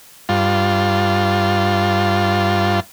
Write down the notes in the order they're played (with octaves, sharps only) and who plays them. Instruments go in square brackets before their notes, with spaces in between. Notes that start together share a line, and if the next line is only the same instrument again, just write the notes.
[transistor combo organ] G2 F4